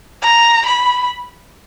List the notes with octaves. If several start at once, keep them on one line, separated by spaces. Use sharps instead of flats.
A#5
B5